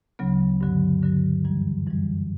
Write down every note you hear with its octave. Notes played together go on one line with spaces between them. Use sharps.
D2 C#3 F#3 B3
G2 D3 F#3
G2 D3 F#3
F#2 E3 G3
F#2 E3 G3